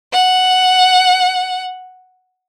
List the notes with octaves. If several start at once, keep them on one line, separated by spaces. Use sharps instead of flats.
F#5